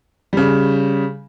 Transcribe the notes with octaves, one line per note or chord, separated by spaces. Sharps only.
C#3 G3